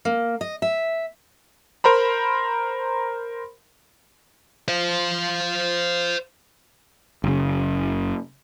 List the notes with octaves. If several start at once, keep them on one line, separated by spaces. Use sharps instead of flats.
A#3
D#5
E5
A#4 C5 A#5 B5
C5 F5
F#1 C#3